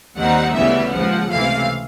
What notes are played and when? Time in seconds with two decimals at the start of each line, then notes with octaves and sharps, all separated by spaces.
0.17 D#2 D#3 G3 C4 D#4 F#5
0.55 D2 C#3 E3 G3 B3 E5
0.92 D#2 C#3 F3 G#3 F#5
1.31 C#2 C3 E3 A3 F5